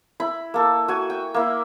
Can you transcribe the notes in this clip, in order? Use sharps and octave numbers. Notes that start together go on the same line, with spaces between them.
E4 B5
A#3 A4
F#4 G#5
G5
A#3 E4